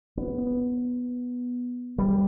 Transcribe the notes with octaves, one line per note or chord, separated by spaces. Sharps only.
B3
G3